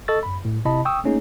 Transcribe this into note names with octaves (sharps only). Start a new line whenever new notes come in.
A4 D#5 C#6 E6 A6
F#2 B5
A2
G1 C3 E4 D#5 A5 B5
G5 C#6 D#6 E6
A3 A#3 C#4 D#4 G#4